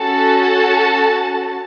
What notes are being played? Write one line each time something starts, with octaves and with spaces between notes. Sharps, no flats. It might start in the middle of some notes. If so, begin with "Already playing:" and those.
Already playing: C#4 F#4 A4 A5